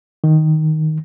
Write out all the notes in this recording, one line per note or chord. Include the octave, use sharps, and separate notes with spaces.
D#3